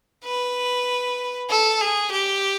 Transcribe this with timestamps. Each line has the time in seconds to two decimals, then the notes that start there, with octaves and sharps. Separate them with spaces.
0.24 B4
1.50 A4
1.81 G#4
2.12 G4